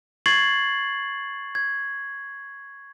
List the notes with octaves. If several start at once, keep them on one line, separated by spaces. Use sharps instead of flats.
C#6 G#6 A6 C7 F#7
G#6